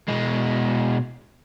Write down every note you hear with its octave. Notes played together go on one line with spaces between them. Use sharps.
B2 G#3